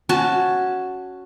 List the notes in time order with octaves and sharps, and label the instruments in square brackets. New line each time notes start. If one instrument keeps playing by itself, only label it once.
[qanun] C#4 F#4 A5